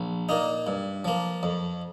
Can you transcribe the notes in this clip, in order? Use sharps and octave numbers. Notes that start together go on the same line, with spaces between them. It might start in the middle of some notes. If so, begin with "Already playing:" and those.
Already playing: A#1
A#2 A#3 D#4
G2
F3 A#3
F2